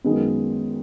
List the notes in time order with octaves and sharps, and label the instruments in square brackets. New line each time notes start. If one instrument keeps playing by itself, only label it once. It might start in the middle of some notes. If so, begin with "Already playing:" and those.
[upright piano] F#2 D#3 G#3 B3